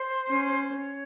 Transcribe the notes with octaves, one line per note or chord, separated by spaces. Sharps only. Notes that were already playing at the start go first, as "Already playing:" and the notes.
Already playing: C5
C#4
C5
C#5